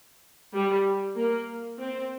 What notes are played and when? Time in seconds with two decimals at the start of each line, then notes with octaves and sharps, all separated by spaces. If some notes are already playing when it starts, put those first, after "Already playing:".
0.54 G3
1.17 A#3
1.78 C4